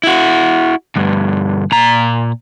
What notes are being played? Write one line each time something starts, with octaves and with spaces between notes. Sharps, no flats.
E4 F#4
D2 G2
A#2 A#5